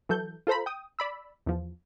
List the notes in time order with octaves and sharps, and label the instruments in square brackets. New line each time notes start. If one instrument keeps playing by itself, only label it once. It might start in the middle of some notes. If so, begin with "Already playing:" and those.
[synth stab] E3 F#3 A4 G6
F4 A4 C5 A#5 B5
G5 D#6
D5 B5 E6
E2 F3